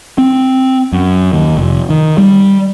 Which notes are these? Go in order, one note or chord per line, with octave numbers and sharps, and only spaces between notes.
C4
F#2
D#2
F1
D#3
G3